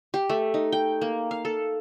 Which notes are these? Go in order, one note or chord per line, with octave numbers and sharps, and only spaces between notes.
G4
A3
D#4
G5
A#3
F5
A4